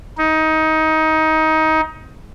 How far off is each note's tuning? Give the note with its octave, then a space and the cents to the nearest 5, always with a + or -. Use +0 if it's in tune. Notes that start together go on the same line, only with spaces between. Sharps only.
D#4 +20